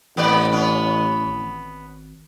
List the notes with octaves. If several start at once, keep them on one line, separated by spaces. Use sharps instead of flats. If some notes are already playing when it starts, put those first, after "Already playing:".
A1 A#3 B3 D5
D1 B3 C#4
G#1